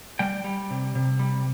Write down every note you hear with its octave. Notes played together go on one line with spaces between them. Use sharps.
G3 G5
G3
C3
C3
G3